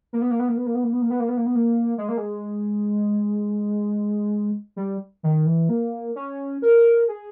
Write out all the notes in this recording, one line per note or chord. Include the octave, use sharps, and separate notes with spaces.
A#3
B3
A#3
B3
A#3
B3
A#3
B3
A#3
B3
A#3
B3
A#3
B3
A#3
B3
A#3
G#3
A#3
G#3
G3
D#3
E3
A#3
C#4
A#4
G#4